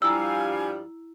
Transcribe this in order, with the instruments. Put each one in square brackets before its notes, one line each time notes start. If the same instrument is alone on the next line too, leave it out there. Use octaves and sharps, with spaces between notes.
[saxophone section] G2 F3 G3 [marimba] E4 A#5 [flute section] F5 G#5 [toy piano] E6